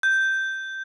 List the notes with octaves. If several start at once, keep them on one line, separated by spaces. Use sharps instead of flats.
G6